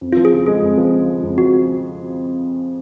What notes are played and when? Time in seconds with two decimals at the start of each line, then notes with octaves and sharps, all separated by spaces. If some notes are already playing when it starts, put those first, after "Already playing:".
0.01 F2
0.12 F3 F4
0.25 G#4
0.32 C#3
0.46 G#3 G#4
0.62 F2
0.77 F3
0.93 C#3
1.08 G#3
1.23 F2
1.38 F3 F#4